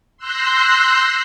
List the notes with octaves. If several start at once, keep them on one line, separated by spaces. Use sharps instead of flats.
C6 E6 F#6 G6 A#6 C7